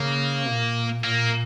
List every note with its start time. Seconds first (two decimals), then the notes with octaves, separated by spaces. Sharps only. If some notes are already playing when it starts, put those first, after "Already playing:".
Already playing: C#3 A#3
0.49 A#2
1.04 A#2 A#3